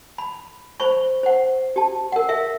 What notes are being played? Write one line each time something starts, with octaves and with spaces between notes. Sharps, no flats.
B5
C5 B5 C#6
C5 F#5
G4 A5
A#4 F#5
G#4 A#4 E5 F5